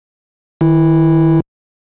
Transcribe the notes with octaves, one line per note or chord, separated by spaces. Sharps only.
D#3 E4